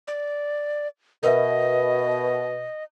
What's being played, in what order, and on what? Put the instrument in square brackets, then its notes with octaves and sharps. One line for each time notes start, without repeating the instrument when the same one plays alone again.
[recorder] D5
[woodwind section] B2 [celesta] A#4 B4 E5 [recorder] D#5